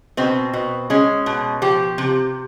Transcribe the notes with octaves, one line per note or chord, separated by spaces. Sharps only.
B2 C4
B2
G#3 C#4
B2
F3 G4
C3